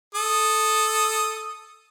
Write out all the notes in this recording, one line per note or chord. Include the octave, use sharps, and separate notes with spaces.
A4 D#6